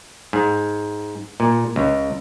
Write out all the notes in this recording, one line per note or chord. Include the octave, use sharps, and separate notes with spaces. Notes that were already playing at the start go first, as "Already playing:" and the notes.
G#2
A#2
C#2